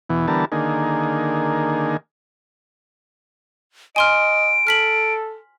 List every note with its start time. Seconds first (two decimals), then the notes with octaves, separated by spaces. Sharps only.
0.10 E2 B2 E3
0.28 D3 E3 G3 B3 A#4 A5
0.52 D3 D#3 A#3 G#4
3.96 D#5 G#5 C6 F6 D7
4.67 A4 F6 B6 F#7